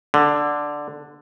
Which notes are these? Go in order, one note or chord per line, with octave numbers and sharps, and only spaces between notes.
D3